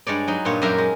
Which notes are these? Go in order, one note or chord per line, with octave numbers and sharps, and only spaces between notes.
G2 G#3 C#5 D5
F#3 D#4
G2 A#2 F4 C#5
F#2 G4 A#4 E5 A#5
G#3